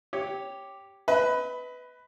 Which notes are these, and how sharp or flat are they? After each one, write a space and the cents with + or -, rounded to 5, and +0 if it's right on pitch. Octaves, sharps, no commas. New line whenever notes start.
G4 +0 C#5 +0
B4 +10 D#5 +40 B5 +0